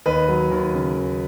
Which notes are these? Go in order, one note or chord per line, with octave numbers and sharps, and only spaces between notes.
D#2 B4 D#5
F#3
D#2
C#3
D#2